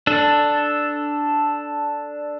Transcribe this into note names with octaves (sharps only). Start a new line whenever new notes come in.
D4 A4